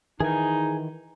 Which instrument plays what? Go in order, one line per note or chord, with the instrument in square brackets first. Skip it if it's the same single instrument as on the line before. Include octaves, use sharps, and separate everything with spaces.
[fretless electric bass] D#3 E3 [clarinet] D#4 [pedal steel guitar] G#4 G#5